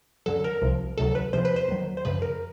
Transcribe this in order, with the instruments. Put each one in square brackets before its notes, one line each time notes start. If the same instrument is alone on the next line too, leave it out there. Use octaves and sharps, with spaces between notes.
[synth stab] F#2 D3 F#3 A4
A#4
C2 C3 F3
D2 C3 D#3 F#3 A4
B4
E2 C3 F3 C5
B4
C5
D#2 D#3 F#3
C5
F#2 C#3 F3 B4
A#4